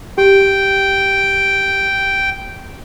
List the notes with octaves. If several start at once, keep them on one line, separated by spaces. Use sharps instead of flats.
G4 G5